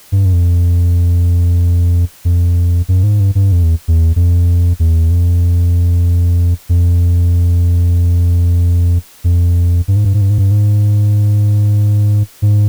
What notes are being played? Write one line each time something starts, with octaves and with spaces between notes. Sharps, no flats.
G2
F#2
F2
F2
F#2
G#2
G2
G2
F2
E2
E2
F2
E2
F2
F2
F2
G2
G#2
G2
G#2
G2
G#2
G2
G#2
G#2